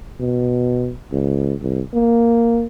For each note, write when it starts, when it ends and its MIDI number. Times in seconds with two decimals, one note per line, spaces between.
0.20 0.91 47
1.12 1.54 37
1.61 1.81 36
1.93 2.66 58